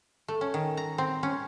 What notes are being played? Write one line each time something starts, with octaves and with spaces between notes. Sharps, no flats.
A3
C#4
D#3
A#5
C4
C#4